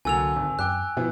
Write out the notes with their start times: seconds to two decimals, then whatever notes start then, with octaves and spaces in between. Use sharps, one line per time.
0.05 C2 D3 F#3 A#3 G#5 E6 F7
0.36 G#1
0.59 F#2 G5 D6 E6 F#6
0.97 B2 E3 F3 B3